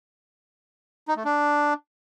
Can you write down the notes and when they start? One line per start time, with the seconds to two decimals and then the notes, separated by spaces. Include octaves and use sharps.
1.08 D#4
1.17 A3
1.25 D4